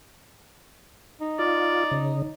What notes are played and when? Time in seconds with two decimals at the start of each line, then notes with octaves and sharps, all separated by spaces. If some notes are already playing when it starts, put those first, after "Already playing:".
1.21 D#4
1.39 F4 D5
1.91 C#3